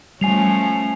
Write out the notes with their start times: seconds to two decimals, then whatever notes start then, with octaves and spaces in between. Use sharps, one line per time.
0.21 F3 G3 A3 C#4 G#5 C7 F7